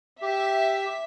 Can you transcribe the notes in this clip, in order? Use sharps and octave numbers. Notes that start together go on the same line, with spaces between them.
G4 E5